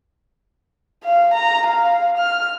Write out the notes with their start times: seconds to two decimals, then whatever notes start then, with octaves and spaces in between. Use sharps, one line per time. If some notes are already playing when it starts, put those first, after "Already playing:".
1.04 F5
1.34 A#5
1.67 F5
2.18 F6